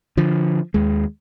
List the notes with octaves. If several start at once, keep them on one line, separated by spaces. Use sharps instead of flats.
D3 F3
D#2 G#3